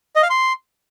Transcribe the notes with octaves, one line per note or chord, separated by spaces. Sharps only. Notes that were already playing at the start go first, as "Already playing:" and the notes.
D#5
F5
C6